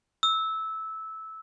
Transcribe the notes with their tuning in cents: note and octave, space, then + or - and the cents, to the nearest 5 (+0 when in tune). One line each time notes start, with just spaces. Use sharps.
E6 -15